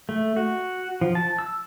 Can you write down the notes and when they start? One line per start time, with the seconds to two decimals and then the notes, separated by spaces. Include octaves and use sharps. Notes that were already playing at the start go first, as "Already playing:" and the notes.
0.09 A3
0.36 F#4
1.01 F3
1.15 A5
1.39 E6